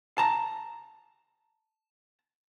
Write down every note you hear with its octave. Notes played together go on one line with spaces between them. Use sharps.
A5 A#5